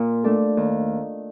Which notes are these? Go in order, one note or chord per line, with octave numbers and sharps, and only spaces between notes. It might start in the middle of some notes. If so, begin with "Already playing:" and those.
Already playing: A#2
A3 D4 A4
D#2